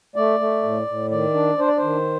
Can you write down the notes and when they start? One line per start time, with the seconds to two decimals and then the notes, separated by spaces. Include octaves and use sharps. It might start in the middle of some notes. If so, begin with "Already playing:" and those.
0.16 A3 D5
0.40 A3
0.63 A2
0.87 A2
1.10 D#3 D5
1.34 D4
1.58 D4 C5
1.68 D5
1.78 D#3 C5